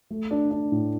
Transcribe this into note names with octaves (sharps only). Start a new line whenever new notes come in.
A3
D4
D4
A2